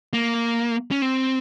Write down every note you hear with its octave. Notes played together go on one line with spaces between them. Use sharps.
A#3
C#4
C4